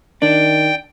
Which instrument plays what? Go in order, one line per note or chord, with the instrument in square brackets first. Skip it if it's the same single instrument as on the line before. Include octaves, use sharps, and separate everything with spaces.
[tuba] D#3 [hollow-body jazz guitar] D4 [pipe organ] G5